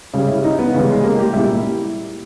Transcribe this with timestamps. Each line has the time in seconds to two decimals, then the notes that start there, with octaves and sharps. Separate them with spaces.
0.14 C#3 G3
0.28 E4
0.44 D#4
0.59 B3
0.74 C#3 E3 G3 G#3
0.89 G#3
1.04 A#3
1.19 G4
1.33 A#2 G3 E4